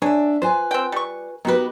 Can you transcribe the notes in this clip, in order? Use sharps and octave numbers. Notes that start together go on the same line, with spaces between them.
D4 G#4 C#5 E5
F4 B4 C5 G#5
C4 G5
G3 C#6
D#3 B3 F#4 G4 B4